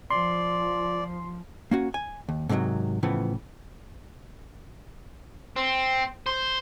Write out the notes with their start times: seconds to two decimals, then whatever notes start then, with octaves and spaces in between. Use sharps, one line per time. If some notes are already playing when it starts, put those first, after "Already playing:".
0.10 F3 D5 C6
1.71 A#3 C#4 F#4
1.94 G#5
2.29 D#2
2.49 G#2 C3 D#3 F3 F#3
3.03 A2 C#3 E3 F3 B3
5.56 C4
6.26 C5